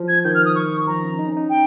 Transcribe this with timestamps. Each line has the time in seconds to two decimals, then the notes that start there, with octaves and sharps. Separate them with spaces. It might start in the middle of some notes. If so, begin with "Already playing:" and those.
Already playing: F3
0.08 G#6
0.24 D#3 G6
0.35 F6
0.45 D#6
0.55 C#6
0.87 F3 A#5
1.03 C#4
1.19 D#4
1.27 C#4
1.37 D#4
1.50 G5